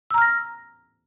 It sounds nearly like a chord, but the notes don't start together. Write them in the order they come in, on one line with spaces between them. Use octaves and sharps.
E6 A#5 F6 A#6